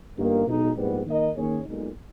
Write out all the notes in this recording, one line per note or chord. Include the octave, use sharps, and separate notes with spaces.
G1 G2 D#3 A#3
B1 B2 G#3 D#4
A#1 G#2 G3 B3
D#3 A#3 D#4 A#4 D#5
D#3 A#3 C#4 G#4 C#5
B1 A#2 G#3 D#4